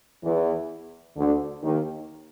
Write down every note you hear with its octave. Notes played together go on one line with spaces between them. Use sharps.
E2 E3
D2 D3
D#2 D#3